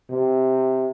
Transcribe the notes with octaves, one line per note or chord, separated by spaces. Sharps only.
C3